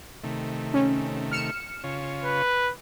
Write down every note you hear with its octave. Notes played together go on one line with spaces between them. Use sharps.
C3 D#3 A3
C#4
F6 C#7 E7
C#3 F4 C#5
B4